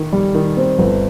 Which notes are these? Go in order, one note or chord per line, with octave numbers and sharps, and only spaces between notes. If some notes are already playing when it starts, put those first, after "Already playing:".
Already playing: D#3
G3
D#3
C4
G1